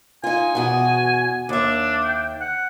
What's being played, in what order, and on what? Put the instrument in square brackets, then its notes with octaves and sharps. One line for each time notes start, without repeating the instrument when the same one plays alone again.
[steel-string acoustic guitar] D#4 F4 [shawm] G#5
[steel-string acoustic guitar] E2 B2 F#4
[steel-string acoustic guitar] D#2 E5 [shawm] D4
[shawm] G5
F#5